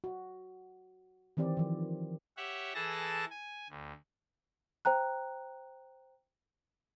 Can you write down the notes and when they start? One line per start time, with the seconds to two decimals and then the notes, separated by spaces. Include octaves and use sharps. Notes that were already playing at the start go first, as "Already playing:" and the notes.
0.04 F#4
1.37 D#3 E3 C4 G4 D5
1.57 D#3 F3
2.37 G4 C#5 E5 F#5
2.75 E3 E4 G#4 A4 A5 A#6
3.30 G#5
3.70 D2
4.85 C5 G5 A#5 F#6